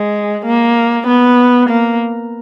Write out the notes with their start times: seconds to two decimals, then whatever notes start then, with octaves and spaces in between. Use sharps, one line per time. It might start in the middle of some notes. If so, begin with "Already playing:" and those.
Already playing: G#3
0.46 A#3
1.08 B3
1.70 A#3